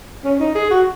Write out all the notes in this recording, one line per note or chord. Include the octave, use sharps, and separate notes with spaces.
C#4
D#4
G#4
F#4